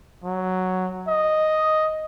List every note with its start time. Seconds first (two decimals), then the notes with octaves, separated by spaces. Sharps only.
0.24 F#3
1.08 D#5